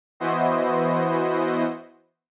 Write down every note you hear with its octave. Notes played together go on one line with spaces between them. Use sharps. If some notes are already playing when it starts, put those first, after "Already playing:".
E3 B3 E4 F#4 C5 D#5